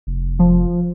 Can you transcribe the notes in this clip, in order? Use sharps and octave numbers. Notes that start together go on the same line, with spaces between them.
F1
F3